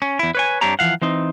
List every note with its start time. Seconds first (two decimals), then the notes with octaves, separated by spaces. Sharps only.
0.02 C#4
0.19 E2 E4
0.35 B4 C#5 G#5
0.61 G2 C4 D4 G4 C#5 A#5
0.79 E3 F3 F5 F#5
1.02 E3 C4 D#4